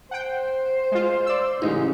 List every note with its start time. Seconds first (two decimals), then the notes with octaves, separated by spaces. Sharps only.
0.11 C5 F#5 G5
0.92 G#3 F4
1.26 D5 C6 E6
1.62 A1 C#3 G#3 D#4